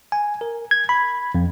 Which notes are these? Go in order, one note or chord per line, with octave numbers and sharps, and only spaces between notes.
G#5
A#4
G#6
B5
F2